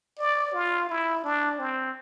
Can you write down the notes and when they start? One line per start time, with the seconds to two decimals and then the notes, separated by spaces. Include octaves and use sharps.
0.18 D5
0.53 F4
0.89 E4
1.24 D4
1.59 C4